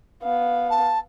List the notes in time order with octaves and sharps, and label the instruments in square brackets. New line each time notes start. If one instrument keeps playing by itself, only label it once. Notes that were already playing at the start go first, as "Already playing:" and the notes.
[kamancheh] B3 F5
[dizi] A5